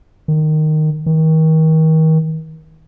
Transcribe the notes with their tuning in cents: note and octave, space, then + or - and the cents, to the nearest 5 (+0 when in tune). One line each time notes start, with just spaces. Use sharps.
D#3 -10
D#3 +35